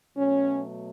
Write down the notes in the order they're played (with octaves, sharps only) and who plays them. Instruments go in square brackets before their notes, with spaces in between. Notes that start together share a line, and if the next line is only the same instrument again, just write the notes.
[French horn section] B2 F#3 A3 C#4